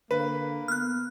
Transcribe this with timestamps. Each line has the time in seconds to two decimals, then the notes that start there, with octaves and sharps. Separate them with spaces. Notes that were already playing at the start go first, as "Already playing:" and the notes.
0.11 D3 A#3 B4
0.68 B3 F6 F#6